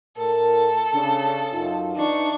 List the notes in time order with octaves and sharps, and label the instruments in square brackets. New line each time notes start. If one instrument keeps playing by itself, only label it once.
[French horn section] A2 A#4 [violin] A4
[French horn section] C#3 D4
F#2 D#4 F4
[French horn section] E3 D#4 [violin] D4 C#6